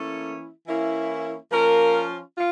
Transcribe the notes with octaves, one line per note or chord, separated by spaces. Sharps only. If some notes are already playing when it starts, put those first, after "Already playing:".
Already playing: E3 A3 A#3 C#4 E4 A4
E3 A#3 C#4 E4
F3 A#3 C#4 F4 A#4
F4